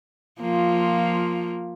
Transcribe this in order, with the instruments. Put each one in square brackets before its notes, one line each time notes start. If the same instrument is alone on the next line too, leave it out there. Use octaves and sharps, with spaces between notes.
[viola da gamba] F3 A#3 F4